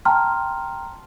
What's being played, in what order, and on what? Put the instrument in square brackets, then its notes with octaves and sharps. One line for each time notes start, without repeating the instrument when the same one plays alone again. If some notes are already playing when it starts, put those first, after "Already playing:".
[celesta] G5 A5 A#5 C6 F6